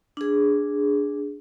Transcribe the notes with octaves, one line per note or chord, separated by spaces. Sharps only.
D4 G#4